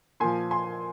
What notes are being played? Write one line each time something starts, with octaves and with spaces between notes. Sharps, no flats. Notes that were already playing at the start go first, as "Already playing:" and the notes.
A#2 F3 G#5 C6
G#5 C6